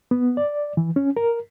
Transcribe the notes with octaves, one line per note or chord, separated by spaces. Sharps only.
B3
D5
E3
C#4
A#4